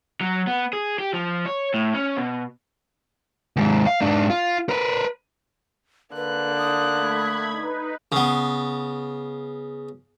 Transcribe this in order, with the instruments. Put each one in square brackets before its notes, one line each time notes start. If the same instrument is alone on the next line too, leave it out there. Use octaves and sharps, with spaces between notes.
[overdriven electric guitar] F#3
B3
G#4
G4
F3
C#5
A2
C#4
B2
[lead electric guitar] D#2 G#2
F5
G#2 D4
F4
A#4 B4
[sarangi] D3 [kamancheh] A#3 F#6 [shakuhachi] B4
[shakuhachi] D#6
[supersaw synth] A3 B5 G#6
D#4 B4
[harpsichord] C#3 B3